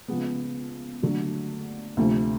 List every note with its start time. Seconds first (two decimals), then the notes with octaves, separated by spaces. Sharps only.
0.08 C#3 F3 G#3 B3
1.02 D3 F#3 A3
1.97 D2 C3 F3 A3